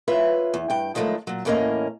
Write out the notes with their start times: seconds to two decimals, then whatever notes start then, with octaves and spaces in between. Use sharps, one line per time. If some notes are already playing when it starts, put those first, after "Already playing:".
0.08 F4 B4 C#5 E5
0.54 E2
0.70 G2 G5
0.95 D#3 F3 F#3 G#3 A3 E4
1.27 A#2 F#3
1.45 E2 A2 A#3 C#4 D#5 A#5